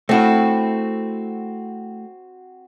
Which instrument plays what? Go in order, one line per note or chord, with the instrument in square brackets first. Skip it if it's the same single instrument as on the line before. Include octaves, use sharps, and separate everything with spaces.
[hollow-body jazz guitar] A3 E4 [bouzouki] C4 F#4